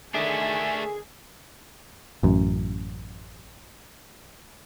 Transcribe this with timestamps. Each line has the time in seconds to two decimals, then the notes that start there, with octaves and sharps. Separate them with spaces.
0.14 D3 D#3 A3 D4 G#4 E5 G#5
2.23 A1 F#2